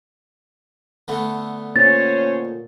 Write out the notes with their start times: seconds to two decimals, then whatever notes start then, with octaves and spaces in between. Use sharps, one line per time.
1.08 D3 A3 B3
1.76 A#2 C#4 C5 C#5 A6